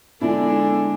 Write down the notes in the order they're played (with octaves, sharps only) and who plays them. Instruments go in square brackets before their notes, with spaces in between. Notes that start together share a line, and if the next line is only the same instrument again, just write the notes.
[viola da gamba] D3 G#3 D4 [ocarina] B3 [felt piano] E4 [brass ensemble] A4 G#5